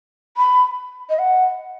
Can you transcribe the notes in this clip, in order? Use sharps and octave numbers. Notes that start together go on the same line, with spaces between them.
B5
D#5
F#5